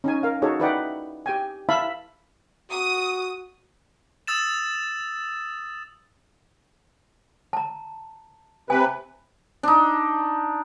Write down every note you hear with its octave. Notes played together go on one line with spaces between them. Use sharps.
C#4 D#4 G#5
A#4 F5
D#4 F#4 G#4 A4 C#5
D#4 E4 B4 D5 F#5 G5
G4 G5 G#5
E4 E5 F5 A5 B5
F#4 D#6
D#6 E6 A6 E7
A5 A#5
C3 B4 G#5
D4 D#4